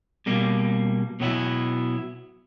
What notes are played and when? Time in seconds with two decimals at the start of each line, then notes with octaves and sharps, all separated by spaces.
0.26 B2 G3 A#3
1.20 B2 F#3 B3 E4